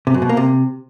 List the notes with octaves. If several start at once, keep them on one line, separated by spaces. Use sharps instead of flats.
C3
F#2
B2
A#3
C3